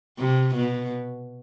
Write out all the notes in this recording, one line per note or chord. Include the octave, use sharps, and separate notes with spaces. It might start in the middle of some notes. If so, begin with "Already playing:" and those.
C3
B2